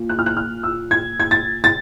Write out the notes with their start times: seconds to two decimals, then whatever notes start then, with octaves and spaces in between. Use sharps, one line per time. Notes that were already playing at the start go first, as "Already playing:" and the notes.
Already playing: A#2
0.09 F#6
0.19 F6
0.26 F#6
0.37 F6
0.63 E6
0.91 G#6
1.20 G#6
1.31 A6
1.64 A6